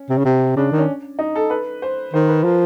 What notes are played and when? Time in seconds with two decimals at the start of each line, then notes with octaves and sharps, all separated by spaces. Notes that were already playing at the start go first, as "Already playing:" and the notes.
Already playing: C#4
0.10 C3
0.18 C#3
0.25 C3
0.56 C#3 D4
0.72 D#3
0.78 C#4
1.19 D#4
1.35 A4
1.50 B4
1.82 C5
2.13 D#3 C5
2.28 B4
2.44 F3 A#4